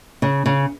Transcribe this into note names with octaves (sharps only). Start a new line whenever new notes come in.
C#3
C#3